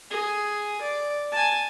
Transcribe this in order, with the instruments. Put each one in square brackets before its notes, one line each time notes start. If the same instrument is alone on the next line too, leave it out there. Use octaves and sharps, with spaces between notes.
[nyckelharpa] G#4
D5
G#5 A5